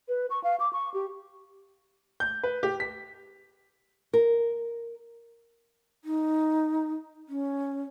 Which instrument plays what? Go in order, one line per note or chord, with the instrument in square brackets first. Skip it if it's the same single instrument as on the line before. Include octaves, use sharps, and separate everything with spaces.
[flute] B4
C#6
F5
D6
C#6
G4
[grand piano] G6
B4
G4
B6
[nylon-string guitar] A#4
[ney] D#4
C#4